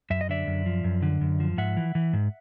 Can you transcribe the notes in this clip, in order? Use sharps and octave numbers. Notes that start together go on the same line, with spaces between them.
F#2 E5
D#5
D3 D5 E5
F#2
F3
F#2
D3
F#2
F3
G#2 E5 F#5
E3
E3
G#2